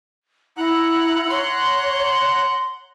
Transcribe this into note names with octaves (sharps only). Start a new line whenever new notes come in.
E4 F#5 A#5 F#6
C#5 C6